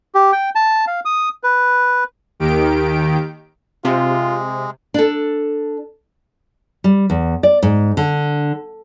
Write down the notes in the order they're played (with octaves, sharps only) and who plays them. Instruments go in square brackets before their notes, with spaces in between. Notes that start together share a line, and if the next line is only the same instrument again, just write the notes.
[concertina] G4
G5
A5
F5
D#6
B4
[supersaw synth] D#2 D#3 G4 D7
[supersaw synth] C3 [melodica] G#3 [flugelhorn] F4
[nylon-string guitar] D4 A4
G3
E2
D5
G#2
D3